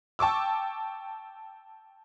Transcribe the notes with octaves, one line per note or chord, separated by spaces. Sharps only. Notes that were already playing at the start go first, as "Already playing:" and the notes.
G5 A5 C#6 D6 E6